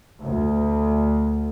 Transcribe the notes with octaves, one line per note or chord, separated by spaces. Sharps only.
D2